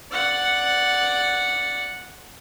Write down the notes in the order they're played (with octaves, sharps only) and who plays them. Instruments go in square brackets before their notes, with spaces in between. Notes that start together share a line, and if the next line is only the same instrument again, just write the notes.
[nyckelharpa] D5 F#5